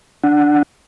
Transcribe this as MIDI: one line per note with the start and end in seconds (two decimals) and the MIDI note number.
0.24 0.62 62
0.24 0.62 78